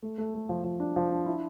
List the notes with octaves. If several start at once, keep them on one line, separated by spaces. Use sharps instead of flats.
A3
A3
A3
F3
F3
D4
F3
D4
E4